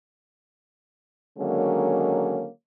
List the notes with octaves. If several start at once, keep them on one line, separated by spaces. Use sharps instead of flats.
D3 D#3 F#3 G#3 A#3 C#4